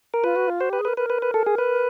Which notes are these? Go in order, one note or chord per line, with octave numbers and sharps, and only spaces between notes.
A#4
F4 B4
F#4
F4
F#4 C5
G4
B4
G#4
A#4 B4
A#4 B4
B4
B4
A4
G#4
B4